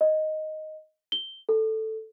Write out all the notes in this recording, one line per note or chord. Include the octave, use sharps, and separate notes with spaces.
D#5
G7
A4